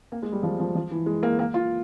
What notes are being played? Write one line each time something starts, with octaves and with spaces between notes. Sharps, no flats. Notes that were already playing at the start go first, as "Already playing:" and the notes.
A#3
G#3
G3
F3
F3
F3
E3
G#3
A#3
A#3
F4